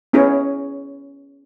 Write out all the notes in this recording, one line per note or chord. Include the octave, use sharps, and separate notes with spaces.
B3 C#4 E4 G#4 C#5